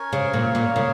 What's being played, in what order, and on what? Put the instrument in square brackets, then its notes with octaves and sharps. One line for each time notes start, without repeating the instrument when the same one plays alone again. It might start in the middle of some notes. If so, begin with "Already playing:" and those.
Already playing: [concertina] C#4 A#4 C#5 G#5
[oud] C#3
A#2
A#2
C#3